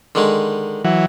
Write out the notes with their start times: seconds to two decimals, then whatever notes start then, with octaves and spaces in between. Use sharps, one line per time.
0.15 D3 D#3 G#3
0.84 E3 F#3